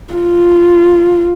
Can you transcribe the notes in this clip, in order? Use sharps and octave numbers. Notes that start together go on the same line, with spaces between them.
F4